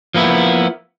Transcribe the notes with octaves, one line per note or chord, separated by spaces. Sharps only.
F3 A#3 B3 E4